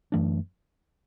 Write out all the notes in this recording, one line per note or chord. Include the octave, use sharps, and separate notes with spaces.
F#2 E3 A3 D4